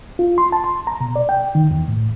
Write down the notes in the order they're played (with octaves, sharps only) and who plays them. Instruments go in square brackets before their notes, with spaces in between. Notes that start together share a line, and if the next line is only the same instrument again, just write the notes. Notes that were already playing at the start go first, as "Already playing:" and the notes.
[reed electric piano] F4
C6
A5
C6
A#5
B2
D5
G5
D#3
E2
A2